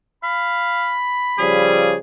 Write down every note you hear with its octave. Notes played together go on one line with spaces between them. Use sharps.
F5 B5
C#3 F3 G3 G#4